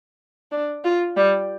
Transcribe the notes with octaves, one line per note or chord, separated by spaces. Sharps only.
D4
F4
G3